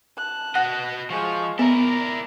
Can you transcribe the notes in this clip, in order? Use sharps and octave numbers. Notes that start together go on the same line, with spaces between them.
A5 F#6
F#4 D#5 F#5
F3 G#3 C#6
B3 E4 A#4 D5 A#5